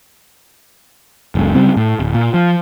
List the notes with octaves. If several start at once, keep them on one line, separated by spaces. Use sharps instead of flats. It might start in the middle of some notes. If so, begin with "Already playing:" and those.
F#1 C#2
C#3 G3 C4
A2
D1
A#2
F3